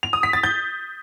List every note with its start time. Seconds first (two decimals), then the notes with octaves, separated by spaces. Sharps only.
0.03 F7
0.13 D#6
0.23 B6
0.33 A6
0.43 G6